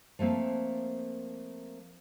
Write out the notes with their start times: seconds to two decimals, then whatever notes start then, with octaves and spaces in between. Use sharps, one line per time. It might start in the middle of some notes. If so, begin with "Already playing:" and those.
0.19 F3 A3 A#3 C4